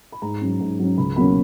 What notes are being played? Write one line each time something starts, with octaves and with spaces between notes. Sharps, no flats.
B5
G#2 A#5
F#3 C#4
G#2
F#3 C#4
C#2 B5
B2 F#3 A#3 C#4 B5